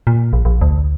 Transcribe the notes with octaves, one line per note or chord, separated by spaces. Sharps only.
A#2
A#1
A#1
D2